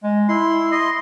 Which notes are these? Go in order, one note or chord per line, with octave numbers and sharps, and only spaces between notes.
G#3
E4 C6
D#5 C6